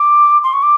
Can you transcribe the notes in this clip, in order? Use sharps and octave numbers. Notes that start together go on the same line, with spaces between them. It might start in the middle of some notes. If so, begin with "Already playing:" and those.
Already playing: D6
C6
C#6
D6